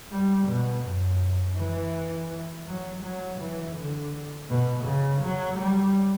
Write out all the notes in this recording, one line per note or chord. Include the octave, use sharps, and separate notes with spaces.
G3
B2
F#2
E3
F#3
F#3
E3
D3
B2
C#3
F#3
G3